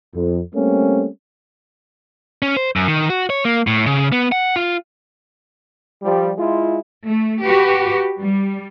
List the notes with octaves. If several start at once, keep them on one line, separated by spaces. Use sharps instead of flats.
F2
G3 A3 A#3 C4 C#4
C#4
C5
F#2
D#3
F#4
C#5
A#3
A2
C#3
B3
F#5
F4
F3 G3
G#3 E4 F4
A3
F#4 G4 B4
G3